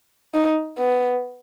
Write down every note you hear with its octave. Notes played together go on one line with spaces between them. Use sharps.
D#4
B3